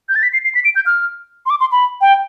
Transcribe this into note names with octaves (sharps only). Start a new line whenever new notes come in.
G6
A6
B6
C7
C7
B6
D7
G6
F6
C6
D6
C6
B5
G5